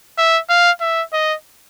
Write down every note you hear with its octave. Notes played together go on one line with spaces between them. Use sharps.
E5
F5
E5
D#5